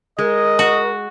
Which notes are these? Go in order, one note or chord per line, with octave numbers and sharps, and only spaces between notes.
G#3 A#4 D#5
F#4